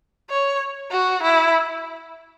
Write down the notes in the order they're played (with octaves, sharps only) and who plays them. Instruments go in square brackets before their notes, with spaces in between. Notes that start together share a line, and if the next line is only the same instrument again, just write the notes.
[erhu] C#5
F#4
E4